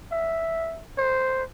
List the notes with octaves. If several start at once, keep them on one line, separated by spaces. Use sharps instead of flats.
E5
C5